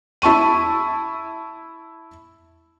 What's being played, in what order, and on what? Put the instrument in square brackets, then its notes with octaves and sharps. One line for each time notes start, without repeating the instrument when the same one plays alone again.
[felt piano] E4 A5 C#6 D#7